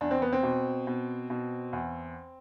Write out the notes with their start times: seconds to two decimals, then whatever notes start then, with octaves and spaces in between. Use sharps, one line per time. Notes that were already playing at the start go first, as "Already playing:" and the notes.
0.01 E2 D4
0.11 C4
0.22 B3
0.33 C4
0.43 B2
0.87 B2
1.30 B2
1.73 E2